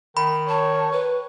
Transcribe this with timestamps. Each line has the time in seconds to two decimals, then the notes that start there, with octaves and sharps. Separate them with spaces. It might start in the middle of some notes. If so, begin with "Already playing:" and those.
0.17 D#3 B5
0.49 C#5 A5
0.92 B4